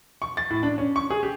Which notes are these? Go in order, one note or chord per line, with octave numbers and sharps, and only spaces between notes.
C#6
A6
A2
D4
C#4
C#6
G#4
G4